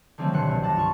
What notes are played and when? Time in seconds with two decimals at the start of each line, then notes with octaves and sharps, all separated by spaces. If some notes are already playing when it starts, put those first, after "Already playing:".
0.18 D3 D#3 F3 F#3 A3 C4
0.33 G1 B2 C6 F#6 C#7
0.48 C2 A#2
0.63 F#5 A5 A6 A#6
0.75 G2 F4 C#6